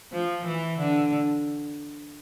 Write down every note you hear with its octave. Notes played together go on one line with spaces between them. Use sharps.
F3
E3
D3